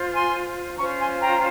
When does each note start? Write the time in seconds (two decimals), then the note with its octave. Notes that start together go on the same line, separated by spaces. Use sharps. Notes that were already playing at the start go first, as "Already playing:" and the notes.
Already playing: F4 C5
0.13 G#5 C6
0.78 C#4 F4 C5 A#5 C#6
1.00 G#5 C6
1.21 G5 A#5